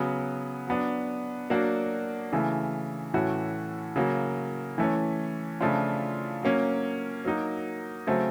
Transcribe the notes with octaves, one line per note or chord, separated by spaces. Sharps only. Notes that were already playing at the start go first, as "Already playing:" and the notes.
Already playing: C#3 F#3 B3
F#3 B3 D4
F#3 A#3 D4 F#4
C#3 E3 A3
A2 E3 A3 C#4 F#4
C#3 F#3 A#3
E3 A3 C#4
C#3 F3 A3 D4 F4
F#3 A#3 C#4
F#3 A#3 D#4 F#4
C#3 F#3 A3 C4